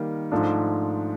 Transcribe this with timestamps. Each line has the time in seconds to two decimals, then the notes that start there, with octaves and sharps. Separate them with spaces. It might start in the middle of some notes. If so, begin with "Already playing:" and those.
Already playing: D#3 G3 A#3
0.32 G#2 F3 A3 D4